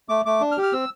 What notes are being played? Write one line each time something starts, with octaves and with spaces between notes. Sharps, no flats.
A3 D6
A3 D6
D4
F6
G4
F6
C4 E6